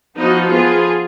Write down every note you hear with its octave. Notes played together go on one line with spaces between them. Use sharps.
F3 B3 D#4 F#4
F3 B3 F4 G#4